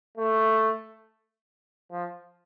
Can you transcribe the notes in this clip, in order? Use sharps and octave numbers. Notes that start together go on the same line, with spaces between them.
A3
F3